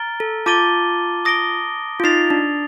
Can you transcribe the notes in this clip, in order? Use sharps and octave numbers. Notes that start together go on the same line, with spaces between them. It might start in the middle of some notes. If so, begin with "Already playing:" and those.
Already playing: A#5 F6 A6 D7 G7
A4
F4 A5 D6 A6 D#7 G7
D#6 A#6 D7 G7
F4
D#4 D#6 A6 C7 F7
D4